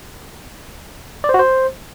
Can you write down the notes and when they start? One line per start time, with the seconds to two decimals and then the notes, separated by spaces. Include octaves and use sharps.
1.24 D5
1.29 C5
1.34 F#4
1.39 C5